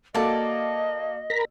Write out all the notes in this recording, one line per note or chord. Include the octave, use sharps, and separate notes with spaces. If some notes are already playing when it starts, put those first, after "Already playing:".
A#3 F#4 A4 D5 D#5 A5
A#4 A#5 B5